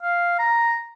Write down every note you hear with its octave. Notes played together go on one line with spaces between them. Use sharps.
F5
A#5